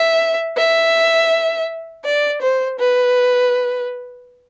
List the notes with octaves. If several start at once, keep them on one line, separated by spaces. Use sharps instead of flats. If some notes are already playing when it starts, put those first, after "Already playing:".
Already playing: E5
E5
D5
C5
B4